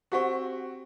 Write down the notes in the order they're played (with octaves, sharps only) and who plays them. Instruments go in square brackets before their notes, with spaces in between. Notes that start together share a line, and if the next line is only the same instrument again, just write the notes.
[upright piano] C4 F#4 [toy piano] G4 F#5 C#6